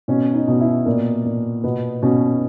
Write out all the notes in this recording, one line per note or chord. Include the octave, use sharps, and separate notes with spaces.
B2 C#4
D#4
B2
E4
A#2 A#3
A#2
B2 B3
B2 C#4